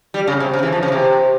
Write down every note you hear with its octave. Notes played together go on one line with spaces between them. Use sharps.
G3
C#3
C3
C#3
E3
F3
C#3
C3